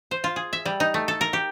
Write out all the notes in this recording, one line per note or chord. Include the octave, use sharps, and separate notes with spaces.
C5
F4
G#4
E5
G3
D#4
A3
A4
A#4
G4